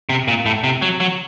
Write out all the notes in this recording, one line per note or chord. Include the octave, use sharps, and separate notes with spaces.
C3
A#2
A2
C3
F#3
F#3